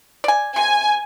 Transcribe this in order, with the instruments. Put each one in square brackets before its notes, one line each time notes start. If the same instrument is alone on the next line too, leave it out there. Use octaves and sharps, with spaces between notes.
[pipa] D5 G#5
[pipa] C3 [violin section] G#5